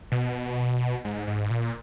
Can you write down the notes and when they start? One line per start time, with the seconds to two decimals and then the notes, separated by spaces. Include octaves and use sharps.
0.12 B2
1.05 G#2
1.27 G#2
1.50 A#2